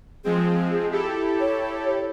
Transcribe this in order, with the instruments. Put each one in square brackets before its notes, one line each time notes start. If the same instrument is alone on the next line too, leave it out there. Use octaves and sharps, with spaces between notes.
[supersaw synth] F3 G#3 C4 [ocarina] G#4
[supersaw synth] E4 G4 A4
[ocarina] C#5